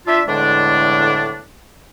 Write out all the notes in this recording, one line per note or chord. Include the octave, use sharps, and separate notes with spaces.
D4 F4 E5
E2 A2 D3 G#3 D4